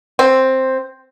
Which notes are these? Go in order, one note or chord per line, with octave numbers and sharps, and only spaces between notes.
C4